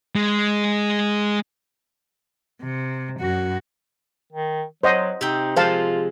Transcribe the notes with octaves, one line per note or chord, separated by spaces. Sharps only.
G#3
C3
F#2 F#4
D#3
F#3 C5 D#5 F#5
C3 D#4 G5
F3 G#3 F4 C5 F5 A5